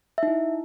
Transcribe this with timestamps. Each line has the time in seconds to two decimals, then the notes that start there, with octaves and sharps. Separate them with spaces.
0.18 E5
0.23 D#4
0.28 E4